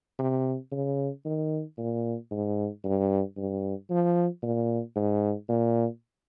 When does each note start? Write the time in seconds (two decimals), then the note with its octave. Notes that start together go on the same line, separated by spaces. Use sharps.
0.19 C3
0.72 C#3
1.25 D#3
1.78 A#2
2.31 G#2
2.84 G2
3.37 G2
3.90 F3
4.43 A#2
4.96 G#2
5.49 A#2